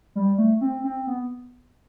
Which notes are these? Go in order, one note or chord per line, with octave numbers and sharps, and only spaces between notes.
G3
A3
C4
C4
B3